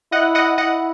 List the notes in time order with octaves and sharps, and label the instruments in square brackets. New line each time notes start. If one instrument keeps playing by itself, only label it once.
[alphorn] E4 [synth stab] D#5 F#5
[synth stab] D#5 F#5
[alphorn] E4 [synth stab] D#5 F#5